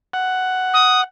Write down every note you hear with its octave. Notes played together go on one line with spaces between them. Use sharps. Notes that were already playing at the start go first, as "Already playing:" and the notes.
F#5
D#6